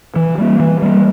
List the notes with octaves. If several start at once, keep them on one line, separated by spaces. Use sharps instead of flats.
E3
G3 A#3
E3
G3 A#3